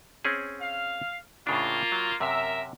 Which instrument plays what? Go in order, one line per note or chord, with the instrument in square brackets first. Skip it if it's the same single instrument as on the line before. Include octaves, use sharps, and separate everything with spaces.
[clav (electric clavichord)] C4 C#4 G#4
[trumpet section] F5
[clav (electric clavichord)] A2 C#3 D4 [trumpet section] A#3 F4
[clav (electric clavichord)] F#3
[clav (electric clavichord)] F#2 C3 [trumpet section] A#4 E5